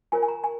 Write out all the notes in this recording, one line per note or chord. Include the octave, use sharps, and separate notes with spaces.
F4 A#4 C#5 G#5
G#5
A#5
G#5